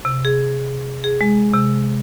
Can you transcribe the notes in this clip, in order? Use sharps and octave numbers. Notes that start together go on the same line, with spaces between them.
C3
G#4
G#4
G#3
C3